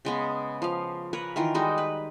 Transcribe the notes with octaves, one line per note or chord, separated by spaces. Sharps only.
C#3 G#3 B3
F3 F5
A#4 B4 C#5
D#3 E3 F4 A#4
G3 G#3 D#4 F#4
B4